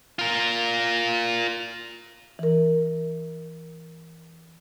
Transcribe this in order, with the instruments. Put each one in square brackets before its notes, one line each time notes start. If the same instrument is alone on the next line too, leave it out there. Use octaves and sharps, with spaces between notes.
[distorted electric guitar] F4 A#4
[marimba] E3 A#4